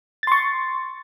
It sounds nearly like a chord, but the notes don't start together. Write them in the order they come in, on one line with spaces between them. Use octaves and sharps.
A6 C6 C#6